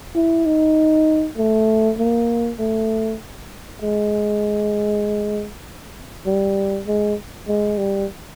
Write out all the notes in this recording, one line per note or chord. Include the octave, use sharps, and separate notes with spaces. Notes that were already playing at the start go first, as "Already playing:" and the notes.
E4
D#4
A3
A#3
A3
G#3
G3
G#3
G#3
G3